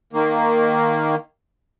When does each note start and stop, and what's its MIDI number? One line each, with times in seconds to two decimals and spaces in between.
0.13 1.15 51
0.13 1.15 58